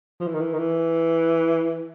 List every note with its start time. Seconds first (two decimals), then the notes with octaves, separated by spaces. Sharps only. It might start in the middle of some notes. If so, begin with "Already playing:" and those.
0.20 F3
0.27 E3
0.34 D#3
0.41 E3
0.53 D#3
0.59 E3